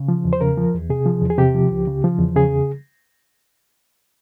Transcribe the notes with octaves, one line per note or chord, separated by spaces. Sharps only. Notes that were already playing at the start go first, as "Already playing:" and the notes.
Already playing: C#3
F3
E2
C5
C#3 A#4
F3
E2
C3 G#4
F3
E2
G#4
C3 G4
F3
C#2
C#3
F3
E2
C#3 G#4